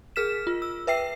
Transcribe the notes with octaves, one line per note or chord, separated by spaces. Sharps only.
G#4 A#4 F6 B6 E7
F4
E6
B4 E5 G5 C7